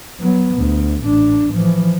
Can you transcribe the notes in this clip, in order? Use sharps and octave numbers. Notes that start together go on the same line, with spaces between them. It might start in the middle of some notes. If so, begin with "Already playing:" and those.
F#3 B3
D2
A1 D4
E3 F3